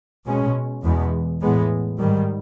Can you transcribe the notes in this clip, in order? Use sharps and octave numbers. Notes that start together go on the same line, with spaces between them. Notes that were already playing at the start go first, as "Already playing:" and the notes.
B2 G#3 C#4
E2 B2 G#3 B3
A2 E3 G#3 B3
G#2 D#3 G3